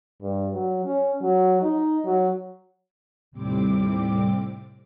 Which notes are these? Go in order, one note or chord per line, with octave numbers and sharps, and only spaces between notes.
G2
F#3
C#4
F#3
D#4
F#3
D#2 A2 C3 G3 C4 D6